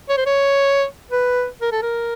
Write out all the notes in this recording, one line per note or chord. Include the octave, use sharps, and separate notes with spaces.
C#5
C5
C#5
B4
A#4
A4
A#4